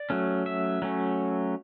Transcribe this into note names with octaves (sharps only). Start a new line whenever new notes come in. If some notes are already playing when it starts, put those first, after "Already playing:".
Already playing: D5
F#3 A3 C#4
E5
F#3 A3 C#4